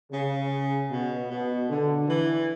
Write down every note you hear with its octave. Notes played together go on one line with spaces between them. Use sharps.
C#3
B2
B2
D3
E3